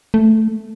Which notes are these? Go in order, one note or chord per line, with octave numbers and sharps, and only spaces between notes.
A3